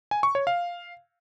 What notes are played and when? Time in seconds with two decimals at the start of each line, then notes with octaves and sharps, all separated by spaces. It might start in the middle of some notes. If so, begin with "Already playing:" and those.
0.11 G#5
0.23 C#6
0.35 C#5
0.47 F5